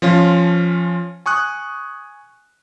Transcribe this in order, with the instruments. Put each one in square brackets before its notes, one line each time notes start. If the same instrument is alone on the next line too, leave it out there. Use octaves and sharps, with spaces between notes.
[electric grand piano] F3 C#4 F4
G#5 C#6 D#6 F#6